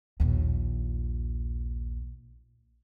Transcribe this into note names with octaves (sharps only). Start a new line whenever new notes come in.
A#1 D#2